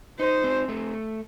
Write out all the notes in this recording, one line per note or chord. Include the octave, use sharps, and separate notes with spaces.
D#4 C5
C4
A3